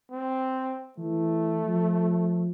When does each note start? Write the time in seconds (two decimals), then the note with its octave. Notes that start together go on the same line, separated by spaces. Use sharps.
0.11 C4
0.98 E3 A3
1.66 F3